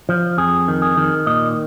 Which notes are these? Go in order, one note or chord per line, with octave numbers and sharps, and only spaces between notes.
F3
F2 G#4
D#3
G#4
D#3
A#2 D#5